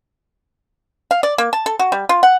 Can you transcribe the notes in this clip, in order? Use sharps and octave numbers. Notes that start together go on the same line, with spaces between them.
F5
D5
A#3
A5
A4
F#4
G3
F4
F#5